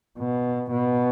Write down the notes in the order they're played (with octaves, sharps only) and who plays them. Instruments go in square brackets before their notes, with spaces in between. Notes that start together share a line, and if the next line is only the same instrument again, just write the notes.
[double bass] B2
B2